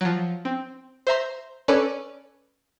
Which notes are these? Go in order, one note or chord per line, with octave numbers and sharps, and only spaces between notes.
F3 F#3
C4
C5 E5 A#5 C6
C#4 A4 B4 C#5 D5